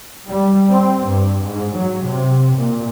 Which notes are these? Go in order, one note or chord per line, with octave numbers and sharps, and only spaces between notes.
G3
C4
G2
G#2
F#3
C3
A#2